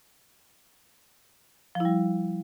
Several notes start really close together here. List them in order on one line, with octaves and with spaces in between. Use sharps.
F3 E4 G3